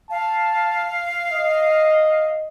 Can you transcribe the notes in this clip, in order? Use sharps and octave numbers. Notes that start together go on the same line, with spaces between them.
F5 A5
D#5